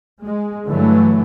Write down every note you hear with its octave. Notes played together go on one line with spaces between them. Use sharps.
G#3
G2 D3 E3 F#3 A3